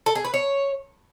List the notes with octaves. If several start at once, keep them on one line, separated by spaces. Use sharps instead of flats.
A4
G#4
B4
C#5